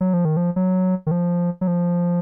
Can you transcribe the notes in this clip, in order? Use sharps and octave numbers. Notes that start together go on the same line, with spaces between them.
F#3
F3
D#3
F3
F#3
D#3
F3
F#3
F3